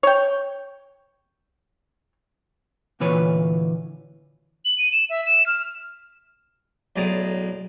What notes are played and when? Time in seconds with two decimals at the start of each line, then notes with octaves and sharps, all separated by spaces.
0.03 C#5 G5
3.00 D2 A#2 E3 B4 C#5
4.65 F#7
4.78 D#7
4.92 E7
5.10 E5
5.26 E7
5.46 F6
6.96 B1 A2 G#4 D5 A#5 D#6